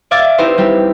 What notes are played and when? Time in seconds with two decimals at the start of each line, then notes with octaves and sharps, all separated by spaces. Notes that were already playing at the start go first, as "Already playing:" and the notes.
0.11 D5 E5 F5 D6 G#6 A6
0.38 C4 D#4 E4 G4 B4 C5
0.58 G3 C4 G4